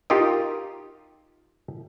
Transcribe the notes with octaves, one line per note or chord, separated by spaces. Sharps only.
D#4 F4 G4 A#4 D#5